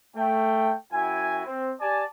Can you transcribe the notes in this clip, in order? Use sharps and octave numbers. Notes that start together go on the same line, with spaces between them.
A3 G5
F#2 E4 F#4 G5 G#5
C4
G4 D5 G#5 A5